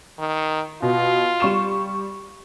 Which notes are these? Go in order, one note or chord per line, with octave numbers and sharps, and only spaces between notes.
D#3
B2 F4
G3 C#6 E7